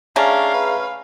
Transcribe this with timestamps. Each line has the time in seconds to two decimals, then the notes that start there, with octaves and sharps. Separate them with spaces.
0.16 A3 C#4 D4 G#4 E5 F5 A#5
0.54 B4